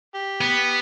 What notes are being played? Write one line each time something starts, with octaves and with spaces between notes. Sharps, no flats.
G4
B3